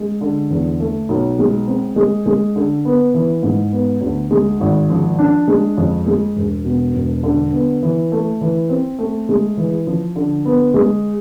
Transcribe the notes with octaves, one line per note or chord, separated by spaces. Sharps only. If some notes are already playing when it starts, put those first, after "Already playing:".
Already playing: G#3
D3
E2
A3
B1
G#3
C4
G#3
G#3
D3
B3
E3
G#2
B3
D2
G#3
G#1
F3
D4
G#3
F2
G#3
E1
B2
E1
D3
B3
E3
A3
E3
C4
A3
G#3
E3
F3
D3
B3
G#3